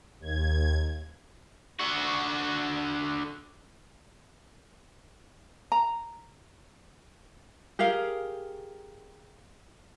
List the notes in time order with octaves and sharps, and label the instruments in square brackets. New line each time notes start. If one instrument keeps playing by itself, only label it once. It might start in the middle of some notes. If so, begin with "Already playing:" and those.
[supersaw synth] D#2 G#6
[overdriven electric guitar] D3 F#4
[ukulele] A#5
G4 G#4 A#4 F5